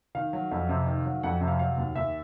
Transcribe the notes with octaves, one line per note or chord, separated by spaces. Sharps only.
D#3 F5
F#3
F2
C3
D#3
F#3
F2 F#5
C3
F5
F#3 F5
D#2
D#2 E5